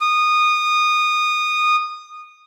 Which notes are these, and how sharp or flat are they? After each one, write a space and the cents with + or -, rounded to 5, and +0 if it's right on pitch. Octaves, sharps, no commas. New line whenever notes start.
D#6 -20